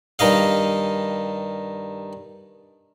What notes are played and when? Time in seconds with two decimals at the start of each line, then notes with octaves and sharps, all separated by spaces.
0.19 G2 D#3 D#5 F5